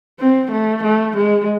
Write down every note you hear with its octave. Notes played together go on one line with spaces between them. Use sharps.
C4
A3
A3
G#3